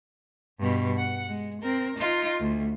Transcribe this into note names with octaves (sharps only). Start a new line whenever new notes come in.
G2 B2
F#5
G#3
C4 A#4
D#4 F4
D2